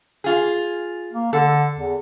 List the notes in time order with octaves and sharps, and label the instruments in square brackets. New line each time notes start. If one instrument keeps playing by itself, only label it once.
[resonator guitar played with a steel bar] F4 G#4
[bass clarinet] A#3
[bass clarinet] D3 [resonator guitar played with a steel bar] A4
[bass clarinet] E2